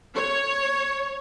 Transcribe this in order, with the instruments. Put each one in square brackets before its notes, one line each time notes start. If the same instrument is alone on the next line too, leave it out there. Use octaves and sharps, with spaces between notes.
[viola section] C#5